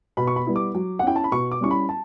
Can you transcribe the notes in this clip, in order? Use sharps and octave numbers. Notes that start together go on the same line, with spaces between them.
B2 B5
C#6
B5
G3 B3 E4
D6
F#3
F#5
C#4 E4 G5
A5
B5
B2 C#6
D6
G3 C#4 E4 C#6
B5
A5